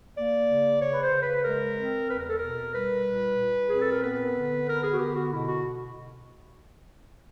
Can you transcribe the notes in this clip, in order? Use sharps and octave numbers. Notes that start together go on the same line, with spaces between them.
A#3 D5
C#3
C#3 C#5
B4
C5
C#3
B4
G#3 A#4
C4
E2 B4
A#4
A4
B2 A#4
G3 B4
A#2
A#2
C4 G#4
A4
A#4
B3 B4
D3
B3 A#4
G#4
F#4
D3 G4
F#4
B2 E4
F#4